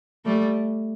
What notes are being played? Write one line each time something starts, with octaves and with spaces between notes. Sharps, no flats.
G3 A3